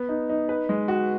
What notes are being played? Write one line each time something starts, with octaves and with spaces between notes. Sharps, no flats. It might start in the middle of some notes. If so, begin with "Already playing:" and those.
Already playing: B3
D#4
D#4
B4
G#3
F#4